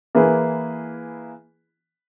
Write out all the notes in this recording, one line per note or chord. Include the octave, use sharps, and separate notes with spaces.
E3 A#3 E4 G#4 B4